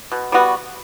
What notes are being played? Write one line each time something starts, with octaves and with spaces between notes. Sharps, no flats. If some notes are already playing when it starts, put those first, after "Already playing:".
B2
G3 B3 F#4